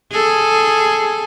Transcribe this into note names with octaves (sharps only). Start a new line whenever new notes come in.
G#4 A4